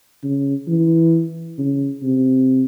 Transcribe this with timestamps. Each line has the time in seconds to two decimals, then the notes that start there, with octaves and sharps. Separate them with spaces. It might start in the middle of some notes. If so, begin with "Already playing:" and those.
0.23 C#3
0.68 E3
1.58 C#3
2.03 C3